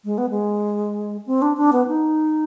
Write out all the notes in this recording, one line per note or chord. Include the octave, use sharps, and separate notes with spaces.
G#3
B3
G#3
C4
D4
D4
B3
D#4